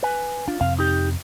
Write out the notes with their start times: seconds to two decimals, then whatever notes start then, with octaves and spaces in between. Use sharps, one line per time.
0.03 B4 G#5
0.48 D4 F4
0.61 F2 C3 C4 F5
0.79 D#4 G4